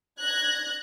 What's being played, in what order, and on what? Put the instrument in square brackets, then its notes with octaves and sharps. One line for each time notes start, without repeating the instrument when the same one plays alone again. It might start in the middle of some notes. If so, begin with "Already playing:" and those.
[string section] F#6 G#6 A#6